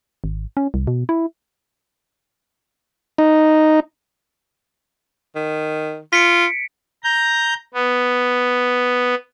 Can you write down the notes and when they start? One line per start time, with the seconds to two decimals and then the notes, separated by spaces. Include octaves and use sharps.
0.24 G#1
0.57 C#4
0.74 C2
0.87 B2
1.09 E4
3.18 D#4
5.35 D#3
6.13 F4 B6 C#7 D7
7.04 A#5 G6
7.74 B3